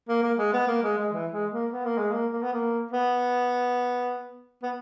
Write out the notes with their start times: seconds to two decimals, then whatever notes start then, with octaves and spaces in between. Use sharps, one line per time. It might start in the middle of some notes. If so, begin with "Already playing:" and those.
0.08 A#3
0.23 A#3
0.38 G#3
0.53 B3
0.68 A#3
0.83 G#3
0.98 G#3
1.13 E3
1.32 G#3
1.52 A#3
1.72 B3
1.85 A#3
1.98 G#3
2.12 A#3
2.32 A#3
2.42 B3
2.53 A#3
2.91 B3
4.63 B3